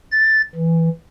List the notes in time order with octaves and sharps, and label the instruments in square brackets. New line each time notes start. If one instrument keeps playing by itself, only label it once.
[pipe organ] A6
E3